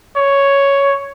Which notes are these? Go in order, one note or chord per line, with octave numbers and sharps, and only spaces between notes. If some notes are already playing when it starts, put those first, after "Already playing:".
C#5